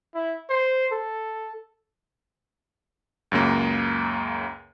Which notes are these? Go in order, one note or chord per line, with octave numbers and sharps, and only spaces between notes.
E4
C5
A4
C#2 F#2 C#3 A#3